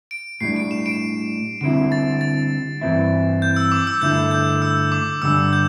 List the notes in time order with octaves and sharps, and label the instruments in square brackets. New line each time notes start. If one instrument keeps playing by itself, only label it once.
[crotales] D7
[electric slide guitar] A2 G3 D4 [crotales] C7
[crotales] D7
E7
D7
[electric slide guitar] D3 G3 C4 E4 [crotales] D7
[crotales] A6
A6
[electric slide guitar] G2 E3 C4 E4
[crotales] G6
E6
D6
E6
[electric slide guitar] G2 D3 A3 E4 [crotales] G6
[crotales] G6
E6
D6
[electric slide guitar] G2 D3 G3 D4 [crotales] E6
[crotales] G6